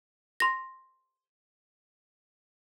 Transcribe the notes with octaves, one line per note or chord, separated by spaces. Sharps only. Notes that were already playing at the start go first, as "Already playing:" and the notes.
C6 A#6